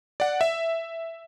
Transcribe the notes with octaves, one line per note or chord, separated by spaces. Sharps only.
D5 F#5
E5